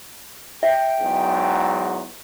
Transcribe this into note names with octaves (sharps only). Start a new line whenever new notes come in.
E5 G5
E2 G#2 F#3